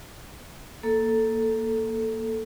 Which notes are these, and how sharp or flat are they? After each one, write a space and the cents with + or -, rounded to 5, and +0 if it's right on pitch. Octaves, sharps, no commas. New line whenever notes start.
A#3 +0 A4 +0